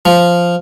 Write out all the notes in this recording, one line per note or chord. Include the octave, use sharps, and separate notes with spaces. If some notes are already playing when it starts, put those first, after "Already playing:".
F3